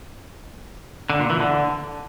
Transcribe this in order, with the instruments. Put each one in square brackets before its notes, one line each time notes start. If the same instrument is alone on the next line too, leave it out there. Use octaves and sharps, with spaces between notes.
[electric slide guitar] D3
A#2
E3
D3